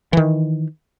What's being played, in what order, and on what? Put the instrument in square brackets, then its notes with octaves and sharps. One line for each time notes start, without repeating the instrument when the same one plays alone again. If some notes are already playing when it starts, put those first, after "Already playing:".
[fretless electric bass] D#3 E3